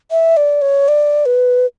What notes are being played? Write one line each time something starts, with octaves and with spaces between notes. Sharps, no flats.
E5
D5
C#5
D5
B4